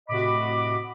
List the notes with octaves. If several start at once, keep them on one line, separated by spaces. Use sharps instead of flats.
A2 C3 F#4 D#5 B5 D6